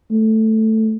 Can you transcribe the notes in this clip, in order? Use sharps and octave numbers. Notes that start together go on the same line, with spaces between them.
A3